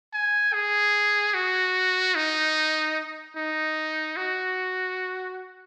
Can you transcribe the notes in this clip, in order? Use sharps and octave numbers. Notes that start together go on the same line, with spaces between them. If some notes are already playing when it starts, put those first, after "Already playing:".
G#5
G#4
F#4
D#4
D#4
F#4